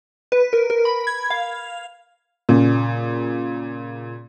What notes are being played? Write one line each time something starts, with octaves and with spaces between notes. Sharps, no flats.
B4
A#4
A#4
B5
G#6
F5
A#2 C#3